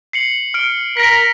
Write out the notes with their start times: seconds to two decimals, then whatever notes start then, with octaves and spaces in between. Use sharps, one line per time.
0.13 C7 C#7 F#7
0.54 F6 D7
0.97 A#4 A#6 B6